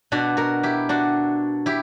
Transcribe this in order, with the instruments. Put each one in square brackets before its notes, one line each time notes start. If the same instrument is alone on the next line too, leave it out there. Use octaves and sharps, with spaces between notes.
[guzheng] B2 D4 F#4
F#4 A#4
E4 G4
D4 F#4
E4 G4